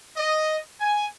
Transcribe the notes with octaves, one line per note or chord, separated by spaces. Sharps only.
D#5
G#5